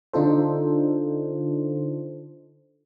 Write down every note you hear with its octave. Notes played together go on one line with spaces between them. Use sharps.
D3 D4 D#4 F4 A4 C5